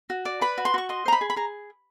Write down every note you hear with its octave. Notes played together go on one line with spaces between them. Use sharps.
F#4
D5
B4 B5
F#4
C6
F#4 C#6
D#5 C6
C5 A#5
B5
G#4
B5
G#4 A#5